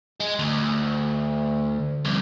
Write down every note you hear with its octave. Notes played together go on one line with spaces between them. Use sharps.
G#3
D2
C2 F2